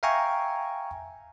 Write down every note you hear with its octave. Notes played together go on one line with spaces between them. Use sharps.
E5 F5 G5 G#5 A#5 C#6